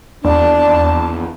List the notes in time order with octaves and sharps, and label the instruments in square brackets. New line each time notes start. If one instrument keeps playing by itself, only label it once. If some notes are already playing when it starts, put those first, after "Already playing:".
[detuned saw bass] E2 [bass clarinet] D4 [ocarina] D5 [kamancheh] A5